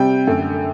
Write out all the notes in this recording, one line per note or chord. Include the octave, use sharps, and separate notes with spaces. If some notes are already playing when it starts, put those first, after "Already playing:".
Already playing: C3 G3 G5
F#2 D3 A3